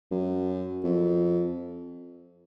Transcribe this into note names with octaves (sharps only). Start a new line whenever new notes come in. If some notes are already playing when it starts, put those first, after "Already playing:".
F#2
F2